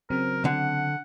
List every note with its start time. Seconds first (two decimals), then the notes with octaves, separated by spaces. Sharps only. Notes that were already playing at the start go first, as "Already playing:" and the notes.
0.10 C#3 F#3 C4 A#4
0.45 D3 F#5